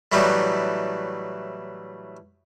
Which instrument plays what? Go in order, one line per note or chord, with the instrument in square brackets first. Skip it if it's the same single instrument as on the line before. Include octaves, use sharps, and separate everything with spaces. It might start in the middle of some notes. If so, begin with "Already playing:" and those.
[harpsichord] A2 E3 F#3 G3 A3 D#4